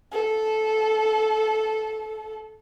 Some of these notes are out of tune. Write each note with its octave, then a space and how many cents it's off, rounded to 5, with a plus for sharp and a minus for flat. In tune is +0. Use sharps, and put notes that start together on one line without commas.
A4 -15